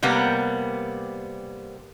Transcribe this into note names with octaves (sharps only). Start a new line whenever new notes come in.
C3 G3 A#3 B3